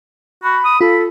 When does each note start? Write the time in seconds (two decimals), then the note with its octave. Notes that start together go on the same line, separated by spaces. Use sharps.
0.43 F#4 B5
0.65 D#6
0.81 F4 A4 B5